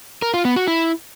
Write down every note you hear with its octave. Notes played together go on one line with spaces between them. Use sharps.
A#4
F4
B3
F#4
E4